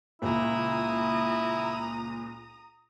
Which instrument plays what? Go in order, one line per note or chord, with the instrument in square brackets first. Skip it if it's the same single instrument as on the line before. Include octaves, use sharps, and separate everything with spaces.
[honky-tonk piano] C#2 A#2 [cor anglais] E4 [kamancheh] A#5 D#6